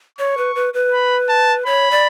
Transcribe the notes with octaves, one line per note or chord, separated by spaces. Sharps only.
C#5 C#6
B4
B4
B4
B5
A5
C#5 B5
D5